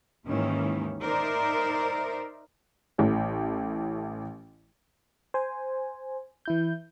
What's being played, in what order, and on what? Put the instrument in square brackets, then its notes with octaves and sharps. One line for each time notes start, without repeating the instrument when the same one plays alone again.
[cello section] D#2 G#2 D#3 E3 C#4
D#4 A#4 C5 D5 E5
[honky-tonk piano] A1 E3 A3 C#5
[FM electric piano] C5 G#5
E3 E4 G6